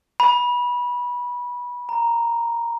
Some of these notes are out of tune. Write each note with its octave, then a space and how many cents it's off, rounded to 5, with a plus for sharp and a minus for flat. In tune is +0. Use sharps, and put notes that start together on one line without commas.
B5 -20
A#5 +0